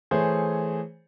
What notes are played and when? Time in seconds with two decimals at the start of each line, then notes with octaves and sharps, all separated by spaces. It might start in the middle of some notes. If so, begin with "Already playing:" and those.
0.11 E3 A3 G#4 C5 C#5